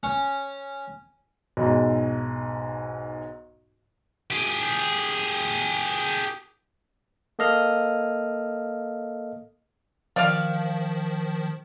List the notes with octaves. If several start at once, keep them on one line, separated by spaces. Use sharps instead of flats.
C#4
B1 G#2
G4 G#4
A#3 A4 D#5 F5 F6
D#3 F3 F4 D5 F5